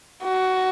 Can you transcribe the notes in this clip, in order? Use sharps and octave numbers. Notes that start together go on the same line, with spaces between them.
F#4